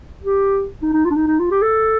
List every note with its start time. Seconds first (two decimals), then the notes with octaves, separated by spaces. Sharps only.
0.24 G4
0.82 D#4
0.93 D#4
1.05 F4
1.11 D4
1.16 D#4
1.27 D#4
1.39 F4
1.51 G4
1.62 A4